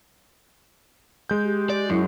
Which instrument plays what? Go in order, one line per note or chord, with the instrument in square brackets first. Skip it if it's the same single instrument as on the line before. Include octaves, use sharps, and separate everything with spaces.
[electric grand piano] G#3 G6
[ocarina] G4
[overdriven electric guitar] D5
[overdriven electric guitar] F#2 [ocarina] E4